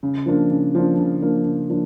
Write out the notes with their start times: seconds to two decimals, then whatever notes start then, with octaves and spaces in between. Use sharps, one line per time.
0.03 C#3
0.26 F3 A#3 D4
0.50 C#3
0.75 F3 A#3 D4
0.99 C#3
1.22 F3 A#3 D4
1.46 C#3
1.70 F3 A#3 D4